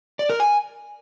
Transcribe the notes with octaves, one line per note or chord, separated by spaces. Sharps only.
D5
A#4
G#5